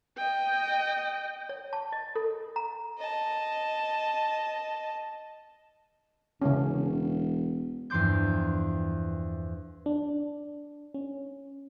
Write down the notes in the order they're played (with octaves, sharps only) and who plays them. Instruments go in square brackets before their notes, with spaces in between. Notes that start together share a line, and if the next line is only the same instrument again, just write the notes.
[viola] D#5 G5
[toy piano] C#5
A5
D#5
A4
A#5
[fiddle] D#5 A5
[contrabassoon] E1 [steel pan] C#3 C#4
[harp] E2 G2 F3 C6 D6 G6
[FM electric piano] D4
C#4